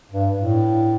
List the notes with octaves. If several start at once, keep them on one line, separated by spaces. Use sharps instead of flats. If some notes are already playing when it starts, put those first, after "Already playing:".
G2
A2